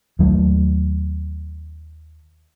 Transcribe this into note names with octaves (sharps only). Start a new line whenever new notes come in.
D#2 F#3 A3